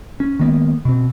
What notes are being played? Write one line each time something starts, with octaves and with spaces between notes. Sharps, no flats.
C#4
D#3 G#3 A#3 B3
B2 C4